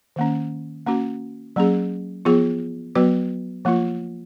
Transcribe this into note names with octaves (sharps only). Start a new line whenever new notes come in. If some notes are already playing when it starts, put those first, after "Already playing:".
D#3 A#3 C#4
A#3 C#4 F#4
F#3 A#3 C#4 G#4
F3 B3 F4 G#4
F#3 B3 F#4 B4
F3 A#3 F4